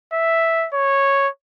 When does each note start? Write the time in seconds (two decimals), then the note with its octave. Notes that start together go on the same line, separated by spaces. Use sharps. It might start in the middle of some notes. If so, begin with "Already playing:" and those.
0.13 E5
0.74 C#5